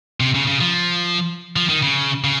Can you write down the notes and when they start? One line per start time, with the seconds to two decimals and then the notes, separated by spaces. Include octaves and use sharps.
0.20 C3
0.34 C#3
0.47 C#3
0.60 F3
1.56 F3
1.69 D#3
1.82 C#3
2.24 C#3